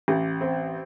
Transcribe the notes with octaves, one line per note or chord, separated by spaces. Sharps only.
A1
C4